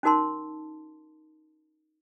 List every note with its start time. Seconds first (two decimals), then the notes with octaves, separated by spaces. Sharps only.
0.03 C#4 D#4 F#4 A#4 A5 C6